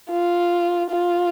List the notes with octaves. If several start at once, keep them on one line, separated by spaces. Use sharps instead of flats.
F4
F4